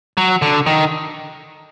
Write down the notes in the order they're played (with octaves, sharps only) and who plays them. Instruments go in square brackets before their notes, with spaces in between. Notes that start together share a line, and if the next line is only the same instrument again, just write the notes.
[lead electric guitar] F#3
D3
D#3